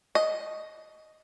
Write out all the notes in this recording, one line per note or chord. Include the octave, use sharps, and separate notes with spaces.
D#5